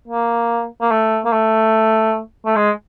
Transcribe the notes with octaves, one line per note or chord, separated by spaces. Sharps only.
A#3
A#3
A3
A#3
A3
A3
G#3